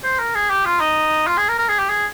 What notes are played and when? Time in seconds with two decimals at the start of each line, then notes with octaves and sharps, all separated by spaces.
0.04 C5
0.19 A#4
0.35 G#4
0.50 G4
0.65 F4
0.80 D#4
1.27 F4
1.37 G#4
1.48 A#4
1.58 A#4
1.69 G#4
1.79 G4
1.89 G#4